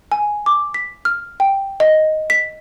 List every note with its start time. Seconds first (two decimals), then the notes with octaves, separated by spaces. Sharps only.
0.12 G#5
0.46 D6
0.74 B6
1.05 F6
1.40 G5
1.80 D#5
2.30 B6